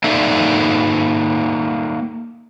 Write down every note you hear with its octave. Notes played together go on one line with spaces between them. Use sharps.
A#3 D#4 A4 D5 E5